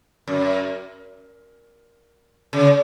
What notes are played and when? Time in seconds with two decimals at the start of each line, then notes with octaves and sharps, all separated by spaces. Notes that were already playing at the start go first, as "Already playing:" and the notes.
0.27 F#2
2.53 C#3